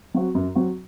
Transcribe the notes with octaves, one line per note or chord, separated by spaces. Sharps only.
F#3 C4 F#4
F#2
F#3 C4 F#4